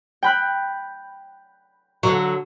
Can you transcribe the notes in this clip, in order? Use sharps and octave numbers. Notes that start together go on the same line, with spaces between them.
G5 B5 F#6
D3 F#3